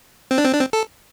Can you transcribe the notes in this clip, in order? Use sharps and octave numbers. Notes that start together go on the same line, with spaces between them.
C4
D4
C4
D4
C4
A4